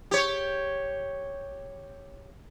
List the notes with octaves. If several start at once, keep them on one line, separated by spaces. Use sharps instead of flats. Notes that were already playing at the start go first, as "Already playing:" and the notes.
G4 C#5